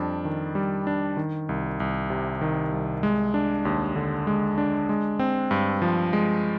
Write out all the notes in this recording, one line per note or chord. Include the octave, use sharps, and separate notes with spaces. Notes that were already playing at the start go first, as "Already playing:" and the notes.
Already playing: F2 G3 D4
D#3
G3
D4
D#3
C2
C2
C3
D#3
C2
G#3
D4
D#2
D3
G#3
D4
G#3
C4
G2
F3
G#3